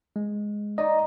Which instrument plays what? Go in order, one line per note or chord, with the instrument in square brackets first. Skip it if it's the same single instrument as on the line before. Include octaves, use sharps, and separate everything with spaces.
[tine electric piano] G#3
[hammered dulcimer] D#4 C#6 [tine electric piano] D5 D#5